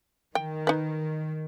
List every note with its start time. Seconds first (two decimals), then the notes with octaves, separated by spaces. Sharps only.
0.35 D#3 G5
0.67 D#4 B4